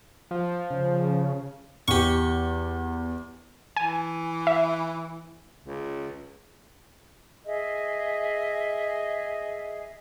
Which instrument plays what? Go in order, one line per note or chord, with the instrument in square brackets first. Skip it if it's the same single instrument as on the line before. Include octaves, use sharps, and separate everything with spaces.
[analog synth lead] F3
[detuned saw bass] C#3
[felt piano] E2 [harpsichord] G4 C#6
[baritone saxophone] E3 [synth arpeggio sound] G#5
[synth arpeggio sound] E5
[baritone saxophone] C#2
[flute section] G#4 D#5 E5